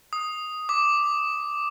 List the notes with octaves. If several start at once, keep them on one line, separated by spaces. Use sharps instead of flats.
D#6
D6